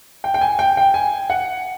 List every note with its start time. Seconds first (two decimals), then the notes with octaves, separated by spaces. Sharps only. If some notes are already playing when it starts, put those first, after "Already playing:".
0.24 G5
0.34 G5
0.41 G#5
0.59 G5
0.77 G5
0.94 G#5
1.30 F#5